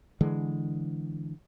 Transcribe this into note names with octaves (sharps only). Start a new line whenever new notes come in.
D3 E3 G#3